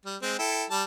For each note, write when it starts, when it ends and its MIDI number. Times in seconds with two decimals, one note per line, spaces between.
0.05 0.16 55
0.22 0.36 56
0.22 0.36 60
0.39 0.64 64
0.39 0.64 69
0.39 0.64 79
0.70 0.83 55
0.70 0.83 81